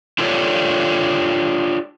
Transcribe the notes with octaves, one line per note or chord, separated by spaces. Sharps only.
D4 F4 G4 A4 C#5 D5